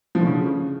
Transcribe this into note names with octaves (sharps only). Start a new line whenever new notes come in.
F3
D3
C#3